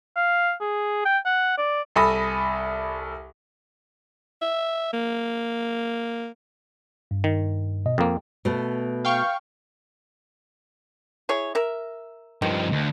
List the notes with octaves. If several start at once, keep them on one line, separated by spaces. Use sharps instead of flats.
F5
G#4
G5
F#5
D5
C2 A4 G#5 B5 D#6 A#6
E5
A#3
G2
D#3
B2 D#5
F2 A#3 G5
B2 A3
F5 G5 C#6
E4 G#4 C#5
A#4 E5
G2 D#3 F3
D2